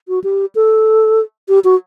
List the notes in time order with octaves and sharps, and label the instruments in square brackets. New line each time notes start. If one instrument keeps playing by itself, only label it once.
[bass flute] F#4
G4
A4
G4
F#4